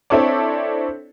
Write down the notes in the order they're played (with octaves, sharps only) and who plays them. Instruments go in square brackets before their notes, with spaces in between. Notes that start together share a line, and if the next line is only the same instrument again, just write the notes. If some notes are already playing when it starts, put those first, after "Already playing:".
[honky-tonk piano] C4 D4 E4 A4 C#5 D5